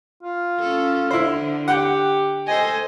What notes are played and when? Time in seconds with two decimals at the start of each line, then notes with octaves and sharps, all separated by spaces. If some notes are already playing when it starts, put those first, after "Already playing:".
0.23 F4
0.59 C#4 A4
1.11 D3 E4 C5
1.68 G4 F#5 G5
2.47 A4 C5 D#5 G#5